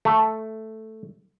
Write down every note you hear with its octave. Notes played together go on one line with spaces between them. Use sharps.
A3